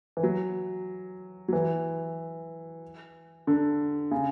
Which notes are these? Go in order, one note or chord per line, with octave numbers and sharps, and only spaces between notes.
E3
F#3
F#3
E3
D3
C#3